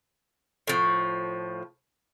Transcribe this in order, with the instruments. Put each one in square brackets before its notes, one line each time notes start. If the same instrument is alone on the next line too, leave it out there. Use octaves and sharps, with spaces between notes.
[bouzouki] A2 F3